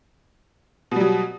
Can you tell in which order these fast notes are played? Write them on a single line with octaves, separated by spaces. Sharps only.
B2 G3 F#3